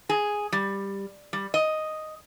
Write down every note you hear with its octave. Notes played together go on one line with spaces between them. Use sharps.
G#4
G3
G3
D#5